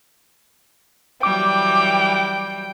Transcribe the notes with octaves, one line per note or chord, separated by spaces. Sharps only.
E3 F#3 G3 G5 D6